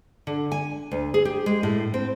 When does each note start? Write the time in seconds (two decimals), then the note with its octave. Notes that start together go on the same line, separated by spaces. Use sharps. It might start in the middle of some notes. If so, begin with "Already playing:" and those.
0.27 D3
0.52 G#5
0.91 D2
1.14 G#4
1.25 G4
1.46 G#3
1.63 A2
1.94 C4